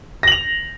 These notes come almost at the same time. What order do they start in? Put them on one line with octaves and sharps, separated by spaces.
A#6 F#7 F7